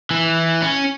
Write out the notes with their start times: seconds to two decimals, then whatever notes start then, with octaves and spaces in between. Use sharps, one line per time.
0.11 E3
0.62 C#4